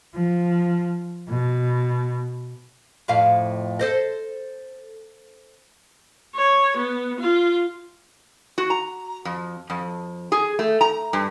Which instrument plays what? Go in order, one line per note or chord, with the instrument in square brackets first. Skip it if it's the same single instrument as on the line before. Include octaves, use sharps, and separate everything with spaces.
[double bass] F3
B2
[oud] F2 A2 F5
A4 C5 D#5
[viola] C#5
B3
F4
[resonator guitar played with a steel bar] F#4
A#5
F2
F2
G#4
A3
A#5
G2